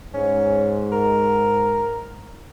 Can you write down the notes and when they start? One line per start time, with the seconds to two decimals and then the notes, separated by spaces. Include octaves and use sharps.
0.14 G#2 C#4
0.92 A#4